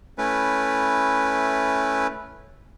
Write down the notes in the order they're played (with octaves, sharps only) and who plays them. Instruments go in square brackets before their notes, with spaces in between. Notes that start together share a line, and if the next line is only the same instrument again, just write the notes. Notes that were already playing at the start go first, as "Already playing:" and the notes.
[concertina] A3 C#4 E4 B4